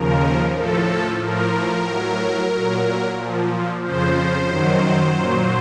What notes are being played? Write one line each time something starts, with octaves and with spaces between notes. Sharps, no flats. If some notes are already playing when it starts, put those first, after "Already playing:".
Already playing: D#2 C#3 F3 A#4
A2 F3 A4
A2 F3 A#4
A2 F#3
A#2 F#3
A#2 F3
F2 C#3 F3 C5
F#2 D#3 F#3
A#2 F#3